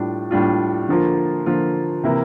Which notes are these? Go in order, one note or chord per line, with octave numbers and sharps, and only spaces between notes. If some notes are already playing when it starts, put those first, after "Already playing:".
Already playing: A2 G3 D4 F4
A2 G3 D4 F4
D3 F3 A#3 F4
D3 F3 A#3 F4
C3 E3 A#3 E4